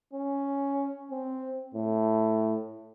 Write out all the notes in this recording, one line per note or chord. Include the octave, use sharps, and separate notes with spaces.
C#4
C4
A2